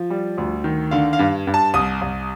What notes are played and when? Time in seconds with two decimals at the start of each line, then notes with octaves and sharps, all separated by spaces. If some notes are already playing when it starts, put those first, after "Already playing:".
Already playing: F3
0.10 G3
0.38 D2
0.64 D#3
0.91 D3 F5
1.13 F5
1.19 G2
1.47 G2
1.54 A5
1.74 C2 D#6
2.01 C2